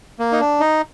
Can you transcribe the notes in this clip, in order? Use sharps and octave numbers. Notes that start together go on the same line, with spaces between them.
A#3
D#4
D4
D#4